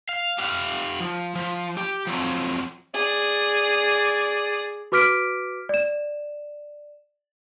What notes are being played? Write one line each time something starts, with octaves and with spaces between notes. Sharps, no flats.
F5
G4 F5 F#5
F3
F3
G4
F3 F#3 C4
G#4 D5
F#4 B4 D6 F6 B6 D7
D5 E7